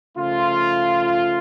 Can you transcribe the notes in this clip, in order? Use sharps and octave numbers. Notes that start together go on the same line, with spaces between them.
C#3 F3 A3 F4